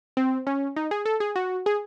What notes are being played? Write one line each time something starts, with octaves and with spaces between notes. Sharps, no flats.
C4
C#4
D#4
G#4
A4
G#4
F#4
G#4